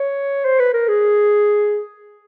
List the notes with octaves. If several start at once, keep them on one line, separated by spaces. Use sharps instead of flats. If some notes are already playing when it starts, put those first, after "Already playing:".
Already playing: C#5
C5
B4
A#4
G#4